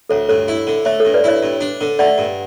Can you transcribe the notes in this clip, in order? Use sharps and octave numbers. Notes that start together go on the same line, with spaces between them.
D2 A4 C#5
G2 A4 C#5
E4
D3
A3 C#5 E5
A4 C#5
G2
B4 D5
E4 C#5 E5
G2
D4
D3
A3 D5 F#5
G2